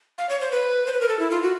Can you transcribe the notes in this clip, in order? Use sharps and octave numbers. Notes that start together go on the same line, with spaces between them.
F5
C#5
C5
B4
C5
B4
A#4
A4
E4
F4
F#4